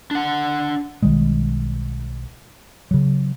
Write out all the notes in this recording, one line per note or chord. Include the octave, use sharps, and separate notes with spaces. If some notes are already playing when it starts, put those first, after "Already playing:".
D4 F#5
B1 D#3 G3 G#3
C#3 F#3